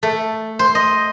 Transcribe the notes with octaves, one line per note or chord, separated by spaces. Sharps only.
A3
C5
D#5